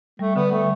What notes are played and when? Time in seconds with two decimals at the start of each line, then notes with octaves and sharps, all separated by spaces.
0.19 G3 A3
0.35 D3 B3
0.52 G3 A3